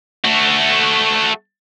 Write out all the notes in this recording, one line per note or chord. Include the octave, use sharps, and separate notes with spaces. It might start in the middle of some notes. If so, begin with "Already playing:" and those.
A3 F#4